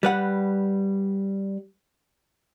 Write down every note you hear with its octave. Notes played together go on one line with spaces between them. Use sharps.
G3 B4 F#5